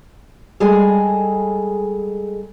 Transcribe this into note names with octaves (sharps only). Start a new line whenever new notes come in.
G3 G#3 G#4 A4 G#5